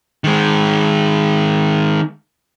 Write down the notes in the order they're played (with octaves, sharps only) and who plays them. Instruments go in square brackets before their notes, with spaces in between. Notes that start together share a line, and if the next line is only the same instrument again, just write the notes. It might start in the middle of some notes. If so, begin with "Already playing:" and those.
[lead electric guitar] D#3 G#3